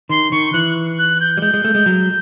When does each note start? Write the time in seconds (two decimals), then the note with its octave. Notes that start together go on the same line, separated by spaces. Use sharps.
0.09 D#3 C6
0.32 D#3 C#6
0.53 E3 F#6
0.98 F#6
1.20 G6
1.37 G3
1.42 G#3 G6
1.54 G#3
1.64 A3
1.75 G#3
1.86 F#3